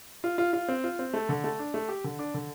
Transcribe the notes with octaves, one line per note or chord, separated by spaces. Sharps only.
F4
F4
F4
C4
F4
C4
A3
D3
A3
D4
A3
G4
D3
D4
D3